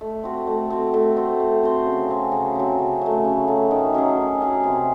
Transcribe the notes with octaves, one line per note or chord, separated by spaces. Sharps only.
A3
C4 F#4
A3
C4 F#4
A3
C4 F#4 C5
A3
C4 F#4 C5
C#3
F#3 C4
C#3
F#3 C4
C#3
F#3 A3
C#3
F#3 A3
D#3
F#3 C#4 G#4
D#3
F#3 C#4 G#4
C3